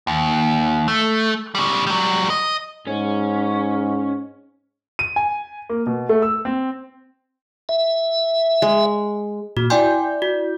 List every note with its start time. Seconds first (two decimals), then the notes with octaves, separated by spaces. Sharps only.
0.07 D#2
0.88 A3
1.55 C#3 G3
1.87 F#3 G3
2.30 D#5
2.87 G#2 C#4
4.99 D#7
5.16 G#5
5.70 A#3
5.87 B2
6.09 A3
6.22 E6
6.45 C4
7.69 E5
8.62 G#3
9.57 A#2 F#4
9.70 E4 D5 G5 G#5 C6 G6
10.22 F#4